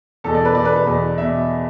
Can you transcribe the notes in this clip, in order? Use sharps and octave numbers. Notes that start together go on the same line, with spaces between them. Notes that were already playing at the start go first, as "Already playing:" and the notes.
E2 B2 A4
D5
B4
E2 B2 D5
B4
B4
E2 B2
B2 E5